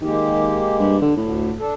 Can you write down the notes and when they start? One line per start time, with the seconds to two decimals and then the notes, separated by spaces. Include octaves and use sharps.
0.02 D#3 G#3 A#3 G4
0.80 G2
1.02 D3
1.17 D2 A2
1.60 D4 A4